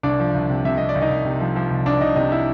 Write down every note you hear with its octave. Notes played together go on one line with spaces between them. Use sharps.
C2 D4 D5
F3
C2
C3
C3 E5
C3 D#5
D5
C2
D#4 D#5
C2
C3
F3
F3
C2
C2 D4 D5
C2 D#4 D#5
C3 D#4 D#5
E4 E5